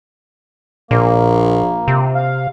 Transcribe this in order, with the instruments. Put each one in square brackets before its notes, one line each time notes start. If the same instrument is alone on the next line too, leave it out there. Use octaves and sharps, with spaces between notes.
[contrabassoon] A#1 [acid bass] A#2 [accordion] A#3
[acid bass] C3
[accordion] F5